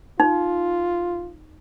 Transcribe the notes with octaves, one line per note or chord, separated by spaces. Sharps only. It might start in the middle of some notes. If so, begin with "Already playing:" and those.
D#4 F4